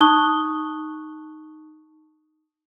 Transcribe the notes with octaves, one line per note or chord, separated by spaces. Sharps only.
D#4 A5 C#6 D#6 F#6 G7